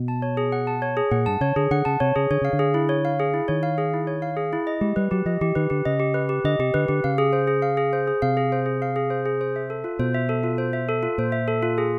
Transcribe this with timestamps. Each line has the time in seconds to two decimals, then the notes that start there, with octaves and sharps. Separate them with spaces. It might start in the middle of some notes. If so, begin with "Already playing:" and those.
Already playing: B2
0.08 A5
0.22 C#5
0.37 G#4
0.52 F#5
0.67 A5
0.82 C#5
0.97 G#4
1.11 A#2 F#5
1.26 G2 A5
1.41 C#3 C#5
1.56 D3 G#4
1.71 D3 F#5
1.85 C#3 A5
2.00 C3 C#5
2.16 C#3 G#4
2.31 D3 C#5
2.41 C#3 F5
2.53 D3
2.59 G#4
2.74 E4
2.89 C#5
3.05 F5
3.20 G#4
3.34 E4
3.48 D#3 C#5
3.63 F5
3.78 G#4
3.94 E4
4.07 C#5
4.22 F5
4.37 G#4
4.53 E4
4.67 D#5
4.81 G#3 G4
4.96 G3 B4
5.11 F#3 G4
5.26 F3 D#5
5.41 E3 G4
5.55 D#3 B4
5.70 D3 G4
5.85 C#3 D#5
5.99 G4
6.14 B4
6.29 G4
6.44 D3 D#5
6.59 C3 G4
6.74 D3 B4
6.88 D3 G4
7.04 C#3 F5
7.18 G#4
7.33 C5
7.47 G#4
7.62 F5
7.77 G#4
7.93 C5
8.07 G#4
8.22 C3 F5
8.37 G#4
8.52 C5
8.66 G#4
8.82 F5
8.96 G#4
9.10 C5
9.26 G#4
9.41 C5
9.56 E5
9.70 A4
9.84 F4
9.99 B2 C5
10.14 E5
10.29 A4
10.43 F4
10.58 C5
10.73 E5
10.89 A4
11.03 F4
11.18 A#2 C5
11.32 E5
11.48 A4
11.62 F4
11.78 G#4